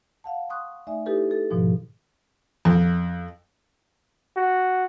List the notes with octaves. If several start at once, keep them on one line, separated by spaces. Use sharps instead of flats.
F5 F#5 A5
C6 C#6 D#6 F#6
A3 D#4 D5 E5 G#5
D#4 E4 G4 A4 B4
A4
G#2 B2 D#3 F3
F2
F#4